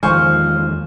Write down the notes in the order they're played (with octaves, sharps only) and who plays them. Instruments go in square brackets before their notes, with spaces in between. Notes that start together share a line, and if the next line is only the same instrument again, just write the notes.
[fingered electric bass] E2 D#3 G#3 [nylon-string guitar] F3 [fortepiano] C5 G#5 C#6 [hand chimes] F6